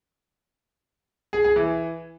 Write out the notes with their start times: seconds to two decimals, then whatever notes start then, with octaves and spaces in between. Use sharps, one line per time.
1.33 G#4
1.44 G#4
1.56 E3